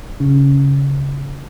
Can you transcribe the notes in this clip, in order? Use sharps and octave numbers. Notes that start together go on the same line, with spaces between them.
C#3